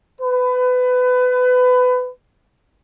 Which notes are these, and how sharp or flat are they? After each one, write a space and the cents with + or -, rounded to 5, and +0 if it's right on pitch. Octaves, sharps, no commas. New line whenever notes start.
B4 +25